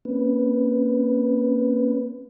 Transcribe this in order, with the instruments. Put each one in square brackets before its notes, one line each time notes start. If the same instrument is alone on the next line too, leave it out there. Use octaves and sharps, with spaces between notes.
[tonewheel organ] A#3 C4 C#4 B4